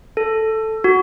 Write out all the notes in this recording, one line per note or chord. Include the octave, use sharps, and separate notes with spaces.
A4
F#4